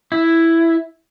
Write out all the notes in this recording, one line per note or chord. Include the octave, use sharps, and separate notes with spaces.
E4